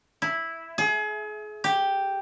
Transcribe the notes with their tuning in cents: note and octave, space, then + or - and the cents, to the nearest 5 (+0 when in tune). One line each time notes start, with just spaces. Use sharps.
E4 -5
G#4 +35
G4 +0